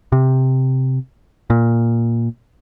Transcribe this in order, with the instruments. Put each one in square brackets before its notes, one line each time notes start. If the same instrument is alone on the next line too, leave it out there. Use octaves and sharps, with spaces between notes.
[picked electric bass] C3
A#2